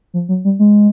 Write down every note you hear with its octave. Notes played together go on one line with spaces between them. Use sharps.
F3
F#3
G3
G#3